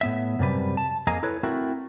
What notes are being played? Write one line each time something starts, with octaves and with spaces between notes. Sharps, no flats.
A2 B3 E5
F#2 C3 G3 B4
A5
F2 A#3 G#4 D#5 A#5
E4 A4 B4 C#5
A3 C4 E4 F#4 A#4